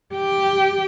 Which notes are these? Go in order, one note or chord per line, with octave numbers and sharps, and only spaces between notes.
G4 G5